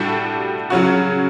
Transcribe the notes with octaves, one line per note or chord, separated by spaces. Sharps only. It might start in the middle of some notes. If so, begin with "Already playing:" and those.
Already playing: A2 G3 D4 F#4 A4
C#3 F#3 C#4 F#4